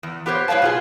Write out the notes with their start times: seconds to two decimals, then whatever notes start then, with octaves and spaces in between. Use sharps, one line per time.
0.03 E2
0.26 B3 G4 A#4 C5 C#5
0.48 A2 B4 C#5 F5 A5
0.62 B2 F4 G#4